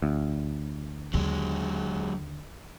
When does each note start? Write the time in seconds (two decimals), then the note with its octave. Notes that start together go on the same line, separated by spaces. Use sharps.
0.02 D2
1.13 D#2 D3 F#3 G#3